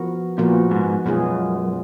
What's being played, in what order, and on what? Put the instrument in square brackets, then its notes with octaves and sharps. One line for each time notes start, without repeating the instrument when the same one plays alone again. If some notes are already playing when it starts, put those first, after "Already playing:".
Already playing: [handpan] F3 B3 F#4 A#4
[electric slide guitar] A#2 [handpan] F3 B3 F#4 A#4
[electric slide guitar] G#2
[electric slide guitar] F#2 [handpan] B2 G#3 B3 F4 G#4